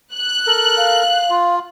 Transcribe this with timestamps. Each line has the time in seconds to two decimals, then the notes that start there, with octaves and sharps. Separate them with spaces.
0.14 F#6
0.47 A4 A#4
0.77 F5
1.30 F4